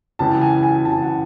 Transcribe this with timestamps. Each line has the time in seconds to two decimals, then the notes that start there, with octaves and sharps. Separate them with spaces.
0.19 C#2 C#3 E3 A5
0.41 G#5
0.63 G#5
0.85 C#2 C#3 E3 A5
1.02 F#5